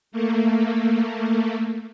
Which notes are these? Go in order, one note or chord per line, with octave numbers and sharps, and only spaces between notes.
A3 A#3